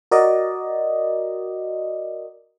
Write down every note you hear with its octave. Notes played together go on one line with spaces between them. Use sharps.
F#4 A#4 D5 D#5